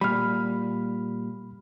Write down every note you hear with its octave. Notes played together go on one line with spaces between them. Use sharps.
A#2 G3 B5 F6